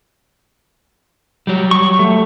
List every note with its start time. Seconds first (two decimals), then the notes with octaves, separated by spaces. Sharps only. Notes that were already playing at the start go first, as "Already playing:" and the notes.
1.47 F#3 G3
1.71 C#6
1.99 A3